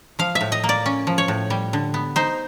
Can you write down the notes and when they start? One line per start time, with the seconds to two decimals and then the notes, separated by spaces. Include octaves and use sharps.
0.19 F3 F5
0.35 E5
0.41 A2
0.52 D#5
0.64 A#3
0.69 D5
0.86 C#4
1.07 F3
1.18 C#5
1.28 A2
1.50 G3
1.73 D3
1.94 B3
2.16 D#4 C5